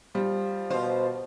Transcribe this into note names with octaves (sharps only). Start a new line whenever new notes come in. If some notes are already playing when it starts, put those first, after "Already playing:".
F3 G3
B2 F4 C5